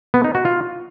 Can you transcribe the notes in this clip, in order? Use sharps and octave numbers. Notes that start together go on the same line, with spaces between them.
B3
D#4
F#4
F4